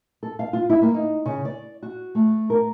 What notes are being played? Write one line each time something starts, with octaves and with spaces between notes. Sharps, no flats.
A4
F5
F4
E4
A#3
D#4
C#3
D5
F#4
A3
A#4